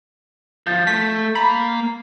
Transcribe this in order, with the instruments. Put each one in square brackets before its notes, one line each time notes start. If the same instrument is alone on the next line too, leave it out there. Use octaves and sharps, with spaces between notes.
[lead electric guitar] F3 [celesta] G6 A6
[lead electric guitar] A3 [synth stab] B6
[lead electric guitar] A#3 A#5 [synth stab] B5